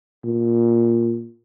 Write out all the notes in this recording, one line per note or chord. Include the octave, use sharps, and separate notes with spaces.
A#2